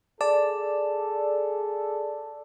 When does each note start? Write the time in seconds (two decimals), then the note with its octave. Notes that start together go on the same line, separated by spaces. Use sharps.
0.21 G#4 A4 D5 A5